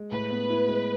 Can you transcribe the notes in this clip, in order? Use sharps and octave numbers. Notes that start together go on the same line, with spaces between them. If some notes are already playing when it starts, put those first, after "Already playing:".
Already playing: G#3
A2 B4
B3
E4
G#3